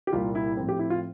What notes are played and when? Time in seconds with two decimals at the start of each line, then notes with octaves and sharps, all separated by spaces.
0.07 G4
0.13 C2 A#2 G3 A#3 F4
0.35 E4
0.57 A2 F3 C4
0.69 G4
0.79 E4
0.90 F4